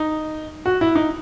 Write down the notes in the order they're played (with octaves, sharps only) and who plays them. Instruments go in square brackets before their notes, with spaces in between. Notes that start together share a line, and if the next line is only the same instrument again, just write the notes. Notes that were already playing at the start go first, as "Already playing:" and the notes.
Already playing: [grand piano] D#4
F#4
E4
D#4